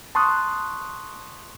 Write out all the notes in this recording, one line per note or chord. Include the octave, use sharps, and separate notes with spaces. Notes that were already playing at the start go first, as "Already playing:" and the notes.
A5 C6 C#6 D#6 F#6